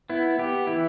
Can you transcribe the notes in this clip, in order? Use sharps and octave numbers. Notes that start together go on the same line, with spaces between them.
B3 E4
B3 G4
E3 E4